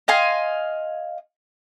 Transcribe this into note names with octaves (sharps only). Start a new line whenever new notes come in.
D#5 F5 G#5 C6